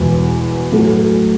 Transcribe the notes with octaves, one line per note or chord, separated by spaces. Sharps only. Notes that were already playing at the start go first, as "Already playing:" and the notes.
Already playing: E1 E2 B2
A2 F#3 A3